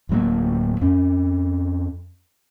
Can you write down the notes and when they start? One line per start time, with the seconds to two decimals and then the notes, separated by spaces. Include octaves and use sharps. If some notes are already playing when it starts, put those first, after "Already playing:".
0.09 D1 A2 F#3 A#3
0.81 F2 C#4